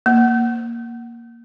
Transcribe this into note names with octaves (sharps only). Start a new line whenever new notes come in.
A#3